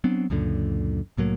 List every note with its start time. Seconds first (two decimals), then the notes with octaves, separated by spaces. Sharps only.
0.04 F#3 B3 C4 D4
0.30 C#2 F#2 A#2 D3
1.17 C2 A2 F#3 A#3